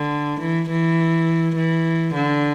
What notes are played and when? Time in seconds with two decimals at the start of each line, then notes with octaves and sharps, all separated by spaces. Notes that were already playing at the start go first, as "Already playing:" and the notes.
Already playing: D3
0.40 E3
0.69 E3
1.55 E3
2.14 D3